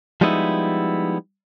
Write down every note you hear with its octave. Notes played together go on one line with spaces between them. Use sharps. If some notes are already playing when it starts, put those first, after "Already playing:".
F3 G3 G#3 B3 D#4 E4